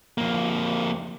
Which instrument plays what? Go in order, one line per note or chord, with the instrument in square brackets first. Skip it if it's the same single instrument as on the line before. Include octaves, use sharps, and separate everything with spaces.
[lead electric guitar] F2 A#3